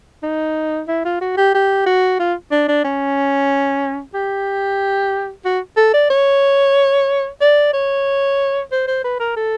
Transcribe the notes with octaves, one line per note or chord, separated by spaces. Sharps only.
D#4
E4
F4
F#4
G4
G4
F#4
F4
D4
D4
C#4
G4
F#4
A4
D5
C#5
D5
C#5
C5
C5
B4
A#4
A4